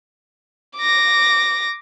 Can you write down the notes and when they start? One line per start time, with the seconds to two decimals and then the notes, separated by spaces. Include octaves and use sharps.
0.77 D6 A#6